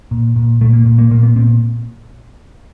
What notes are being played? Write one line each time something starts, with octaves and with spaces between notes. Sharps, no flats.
A#2
A#2
A#2 A3
A#3
A#2
A#3
A#2 A#3
B3
A#2 C4